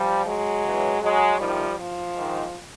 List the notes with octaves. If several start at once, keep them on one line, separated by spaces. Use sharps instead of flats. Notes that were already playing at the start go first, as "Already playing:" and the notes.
Already playing: F3 G3
F#3 G#3
E2 C#3 E3
F#3 G#3
E2 C3 D#3 F3 G3
F3
G#2 D#3